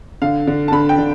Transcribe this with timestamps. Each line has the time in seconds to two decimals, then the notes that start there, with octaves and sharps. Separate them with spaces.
0.22 D3 F5
0.47 D3
0.68 A5
0.72 D3 B5
0.89 G5
0.98 D3